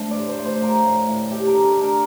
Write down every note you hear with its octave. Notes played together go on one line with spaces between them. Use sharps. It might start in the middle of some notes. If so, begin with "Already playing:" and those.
Already playing: D3 A3 C5
A2 D5
C5
A3
C5
F3 A#4
A2
A2
A3 G4
A#4
D3
A4
D3 A#4